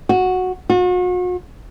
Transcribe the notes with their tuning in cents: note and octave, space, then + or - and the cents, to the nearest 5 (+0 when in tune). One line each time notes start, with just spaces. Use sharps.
F#4 -5
F#4 -40